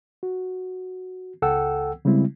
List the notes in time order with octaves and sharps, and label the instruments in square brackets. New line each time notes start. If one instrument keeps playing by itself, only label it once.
[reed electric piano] F#4
C#2 A4 F#5 G5 E6
C#3 G3 G#3 C4 E4